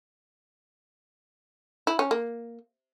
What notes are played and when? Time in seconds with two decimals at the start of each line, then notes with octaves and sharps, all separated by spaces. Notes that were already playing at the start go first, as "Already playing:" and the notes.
1.87 E4
1.99 C#4
2.11 A#3